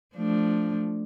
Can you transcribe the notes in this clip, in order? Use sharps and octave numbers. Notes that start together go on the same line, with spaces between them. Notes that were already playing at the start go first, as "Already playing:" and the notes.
F3 A3 D4